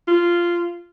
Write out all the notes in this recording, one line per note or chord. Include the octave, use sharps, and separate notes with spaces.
F4